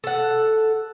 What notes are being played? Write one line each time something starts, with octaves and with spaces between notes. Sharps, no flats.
A4 F#5